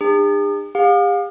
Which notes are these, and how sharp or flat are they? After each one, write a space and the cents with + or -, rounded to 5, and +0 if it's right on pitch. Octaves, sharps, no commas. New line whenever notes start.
D4 +45 G#4 -45
G4 +45 F5 +35